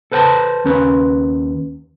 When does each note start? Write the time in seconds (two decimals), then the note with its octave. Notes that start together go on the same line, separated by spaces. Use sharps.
0.12 A4 B4 C5 G5 A5
0.64 D#2 C#4 B4